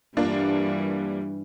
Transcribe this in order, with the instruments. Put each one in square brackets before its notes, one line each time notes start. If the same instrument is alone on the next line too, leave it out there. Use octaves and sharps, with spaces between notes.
[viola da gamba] G2 E3 G3 [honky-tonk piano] A#3 D4 F4